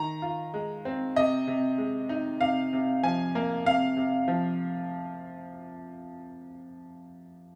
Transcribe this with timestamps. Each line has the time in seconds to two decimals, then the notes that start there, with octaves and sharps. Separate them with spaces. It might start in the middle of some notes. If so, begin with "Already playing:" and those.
Already playing: D#3 A#5
0.22 F4
0.54 G#3
0.85 C4
1.16 C3 D#5
1.47 C3
1.78 G#3
2.09 D#4
2.41 C3 F5
2.73 C3
3.03 F3 G#5
3.35 A#3
3.65 C3 F5
3.97 C3
4.28 F3